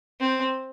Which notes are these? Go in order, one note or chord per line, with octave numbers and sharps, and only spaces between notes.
C4